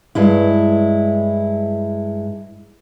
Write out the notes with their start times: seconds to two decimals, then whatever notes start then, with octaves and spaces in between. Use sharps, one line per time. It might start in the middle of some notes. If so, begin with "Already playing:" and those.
0.15 G2 G#3 E4